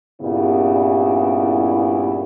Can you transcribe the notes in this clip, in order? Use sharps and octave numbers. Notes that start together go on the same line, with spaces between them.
G2 A#2 C#3 G3 B3 E4